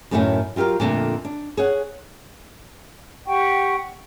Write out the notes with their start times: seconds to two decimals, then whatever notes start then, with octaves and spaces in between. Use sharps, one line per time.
0.11 F#2 A2 D#3 G3 A3 C#4
0.56 F#3 F4 G4 A#4 F5
0.80 F2 A#2 D3 A3
1.25 D4
1.57 G#4 C#5 F#5
3.27 G4 F#5 G5 C#6